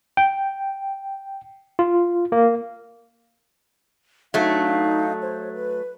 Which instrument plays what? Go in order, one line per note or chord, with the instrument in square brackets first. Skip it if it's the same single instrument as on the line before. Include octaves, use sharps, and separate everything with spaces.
[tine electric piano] G5
F4
A#3
[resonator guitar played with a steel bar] F#3 A3 [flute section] D4 D#4 F5
[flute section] C5 C#5
B4